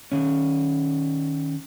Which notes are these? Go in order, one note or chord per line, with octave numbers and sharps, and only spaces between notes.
D#3 C#4